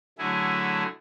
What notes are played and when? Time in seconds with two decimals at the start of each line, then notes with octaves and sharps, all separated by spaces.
0.18 D3 F#3 A3 E4 G#4